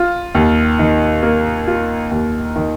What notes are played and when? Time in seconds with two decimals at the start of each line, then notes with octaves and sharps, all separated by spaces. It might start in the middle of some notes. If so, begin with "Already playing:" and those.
Already playing: F4
0.35 D#2
0.79 D#3
1.23 A#3
1.67 F4
2.11 D#2
2.56 D#3